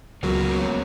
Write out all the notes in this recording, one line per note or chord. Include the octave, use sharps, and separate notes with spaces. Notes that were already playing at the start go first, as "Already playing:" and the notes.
C#2 F#3 A#3 B3 C#4